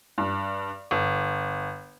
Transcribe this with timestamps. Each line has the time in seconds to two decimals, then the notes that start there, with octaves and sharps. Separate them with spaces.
0.18 G2
0.91 G1